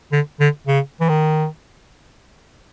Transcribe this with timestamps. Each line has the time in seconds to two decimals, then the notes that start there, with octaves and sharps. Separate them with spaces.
0.12 D3
0.40 D3
0.67 C#3
1.01 E3
1.09 D#3